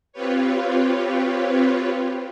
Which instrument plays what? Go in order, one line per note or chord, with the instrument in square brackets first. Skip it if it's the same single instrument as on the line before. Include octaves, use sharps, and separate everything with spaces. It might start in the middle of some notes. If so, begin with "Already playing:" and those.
[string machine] C4 F4 G4 B4 C#5